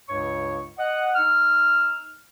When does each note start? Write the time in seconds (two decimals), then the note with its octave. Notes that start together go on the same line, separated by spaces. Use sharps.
0.09 C#2 G2 C#3 C#5 C#6
0.78 D#5 F#5
1.15 D#4 E6 F6